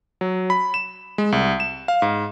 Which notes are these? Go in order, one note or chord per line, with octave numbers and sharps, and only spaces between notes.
F#3
B5
E7
G#3
C2
E7
F5
G#2